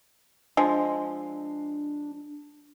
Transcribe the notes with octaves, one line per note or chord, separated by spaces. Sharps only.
F3 G#3 D4